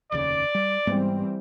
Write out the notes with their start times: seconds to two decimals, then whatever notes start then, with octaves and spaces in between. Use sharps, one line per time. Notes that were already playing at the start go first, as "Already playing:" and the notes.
0.12 F1 D#2 C#3 D5
0.55 G3
0.87 G#2 E3 G3 G#3 B3 C4